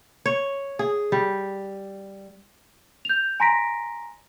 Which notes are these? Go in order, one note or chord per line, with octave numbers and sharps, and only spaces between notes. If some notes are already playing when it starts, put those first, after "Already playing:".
C#5
G#4
G3
G6 F7
G#5 A#5 C6 A#6 B6 D7